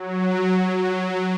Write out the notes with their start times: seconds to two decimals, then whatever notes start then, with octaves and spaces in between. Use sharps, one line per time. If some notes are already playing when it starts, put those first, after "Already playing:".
Already playing: F#3
0.20 F#3
0.53 F#3